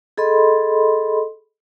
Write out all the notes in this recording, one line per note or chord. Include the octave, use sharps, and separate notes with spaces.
G#4 A4 D#5 B5 C6